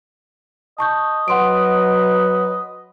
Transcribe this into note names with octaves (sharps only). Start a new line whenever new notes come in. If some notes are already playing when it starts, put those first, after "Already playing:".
D#5 A5 C#6 G6
F#3 B4 F#5 C6 D7